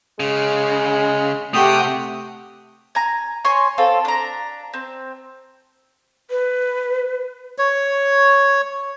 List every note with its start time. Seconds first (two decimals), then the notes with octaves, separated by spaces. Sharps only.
0.20 C#3 G#3
1.54 C3 A3 G4 F#5 G5 D#6
2.95 G#5 A#5
3.44 C#5 G#5 C6 C#6
3.78 C4 F4 A4
4.05 D4 A#5
4.74 C4
6.30 B4
7.58 C#5